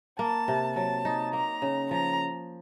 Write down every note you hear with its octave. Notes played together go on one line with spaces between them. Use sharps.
A#3 A5
C3
F#3 A5
D#4
A#3 A#5
C#3
F3 A#5